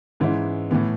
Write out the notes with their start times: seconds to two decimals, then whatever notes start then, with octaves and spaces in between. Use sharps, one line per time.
0.20 G#2 E3 G#3 C#4 E4
0.71 A2 E3 B3